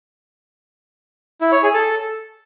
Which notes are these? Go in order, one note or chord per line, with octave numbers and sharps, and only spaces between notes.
E4
C#5
G#4
A4